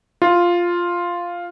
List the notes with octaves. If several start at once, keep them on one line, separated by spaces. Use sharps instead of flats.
F4